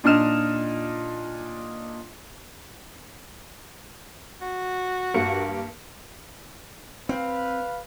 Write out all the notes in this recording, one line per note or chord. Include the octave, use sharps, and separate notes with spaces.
A#2 D4 D#4 D#5 F6 E7
F#4
G2 A#3 C#7
C4 B4 F5